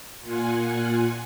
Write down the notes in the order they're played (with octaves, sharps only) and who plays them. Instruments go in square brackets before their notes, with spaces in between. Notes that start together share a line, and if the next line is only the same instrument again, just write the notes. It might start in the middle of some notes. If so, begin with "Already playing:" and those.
[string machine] A#2 F4 F#5 G#5